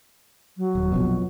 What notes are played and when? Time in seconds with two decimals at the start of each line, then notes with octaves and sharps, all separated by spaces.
0.57 F#3
0.75 D#1
0.92 A#1 F2 B2